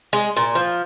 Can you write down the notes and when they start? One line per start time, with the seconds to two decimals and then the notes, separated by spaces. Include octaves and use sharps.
0.13 G#3
0.37 A#2
0.55 F3